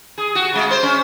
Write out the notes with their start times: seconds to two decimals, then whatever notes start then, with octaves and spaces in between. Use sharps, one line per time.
0.18 G#4
0.35 F#4
0.53 C#3 G#3
0.71 C5
0.83 C#4